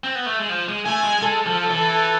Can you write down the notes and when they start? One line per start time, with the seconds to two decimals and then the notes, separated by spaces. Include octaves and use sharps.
0.04 C4
0.15 B3
0.26 A3
0.39 G#3
0.50 F3
0.69 G#3
0.86 A3 G#5
1.04 G#3
1.22 G#3 A4
1.46 F3
1.71 E3